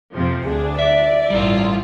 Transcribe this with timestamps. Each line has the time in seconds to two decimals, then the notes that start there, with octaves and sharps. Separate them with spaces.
0.12 F2 C3 F3
0.44 D2 D4 G#4
0.79 D5 E5
1.30 A1 G2 G3 E4 F4